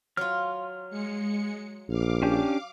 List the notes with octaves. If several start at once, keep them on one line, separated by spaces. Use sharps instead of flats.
F#3 F4 F6
G#3 C#7
A#1 F5 D6
C#4 D4 G4